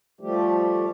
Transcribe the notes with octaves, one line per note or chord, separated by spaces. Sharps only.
F3 G3 A3 G4